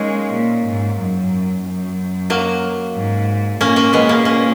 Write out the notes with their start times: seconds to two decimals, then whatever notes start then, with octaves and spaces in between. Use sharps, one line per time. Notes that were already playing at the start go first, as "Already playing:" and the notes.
Already playing: G#3 A#3 C#4 D#4
0.34 A#2
0.67 G#2
0.99 F#2
1.65 F#2
2.30 F#3 A#3
2.95 G#2
3.60 A#2 A#3 C#4
3.76 A#3 C#4
3.93 G#3 B3
4.09 A#3 C#4
4.25 A#3 C#4